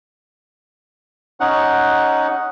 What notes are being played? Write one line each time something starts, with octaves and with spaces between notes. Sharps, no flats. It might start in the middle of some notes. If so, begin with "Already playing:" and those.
C#4 D#4 F#5